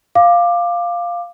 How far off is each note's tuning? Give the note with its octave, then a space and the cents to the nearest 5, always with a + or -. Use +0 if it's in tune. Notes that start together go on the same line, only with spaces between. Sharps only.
F5 +0 D6 +15